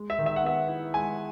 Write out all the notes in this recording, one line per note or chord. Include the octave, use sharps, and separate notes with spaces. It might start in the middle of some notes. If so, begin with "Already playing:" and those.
Already playing: G#3
E5
D#3
E5
F#5
B3 E5
E4
G#3 G#5